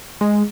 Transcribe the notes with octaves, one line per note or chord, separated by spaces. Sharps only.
G#3